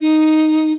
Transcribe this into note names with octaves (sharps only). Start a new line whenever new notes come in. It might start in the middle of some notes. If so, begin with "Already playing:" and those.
D#4